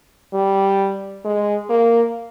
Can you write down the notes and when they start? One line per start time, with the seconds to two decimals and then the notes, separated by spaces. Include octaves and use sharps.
0.33 G3
1.25 G#3
1.69 A#3